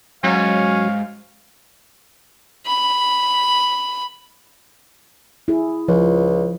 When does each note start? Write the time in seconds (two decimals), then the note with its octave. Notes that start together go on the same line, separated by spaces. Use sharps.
0.24 G#2 F#3 C#4 F5
2.66 B5
5.48 E4 G#4
5.88 C#2 F3